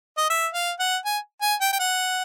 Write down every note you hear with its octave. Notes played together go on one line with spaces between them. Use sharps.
D#5
E5
F5
F#5
G#5
G#5
G5
G5
F#5